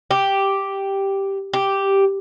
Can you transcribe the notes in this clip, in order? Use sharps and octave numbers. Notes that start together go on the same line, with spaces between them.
G4
G4